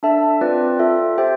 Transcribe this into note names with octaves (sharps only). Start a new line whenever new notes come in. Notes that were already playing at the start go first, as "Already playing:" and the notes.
D4 A4 E5 A5
C4 F4 B4 D5
F4 A4 E5
G4 C5 E5 G5